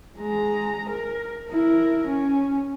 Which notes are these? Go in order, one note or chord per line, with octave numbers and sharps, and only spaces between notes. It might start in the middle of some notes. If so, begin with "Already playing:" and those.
G#3 A#5
A#4
E4 A#4
C#4